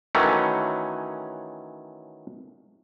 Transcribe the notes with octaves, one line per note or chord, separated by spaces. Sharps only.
D#3 E3 F#3 A3 C#4